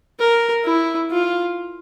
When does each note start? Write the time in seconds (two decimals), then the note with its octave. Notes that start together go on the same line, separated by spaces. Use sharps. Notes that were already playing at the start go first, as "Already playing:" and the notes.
0.19 A#4
0.64 E4
1.11 F4